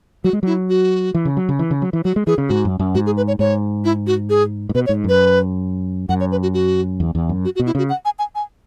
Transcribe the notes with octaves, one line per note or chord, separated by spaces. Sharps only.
F#3 F#4
G#3
F#3 E4
F#4
E3
C#3
F#3
C#3
E3
C#3
F#3
E3
F#3 F#4
G#3
E3 G#4
C#3
G#2 F#4
F#2
F#2
G#2 F#4
G#4
B4
C#5
G#2 C#5
E4
F#4
G#4
G#2
B2 B4
C#5
G#2
F#2 B4
F#2 F#5
C#5
B4
F#4
F#4
E2
E2
F#2
F#4
F#4
B2
E4
C#3 F#4
F#5
G#5
G#5
G#5